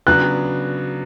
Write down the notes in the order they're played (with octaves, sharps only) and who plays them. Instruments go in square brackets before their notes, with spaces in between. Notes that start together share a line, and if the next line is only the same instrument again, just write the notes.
[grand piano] C#3 F#3 B3 D4 [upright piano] F#6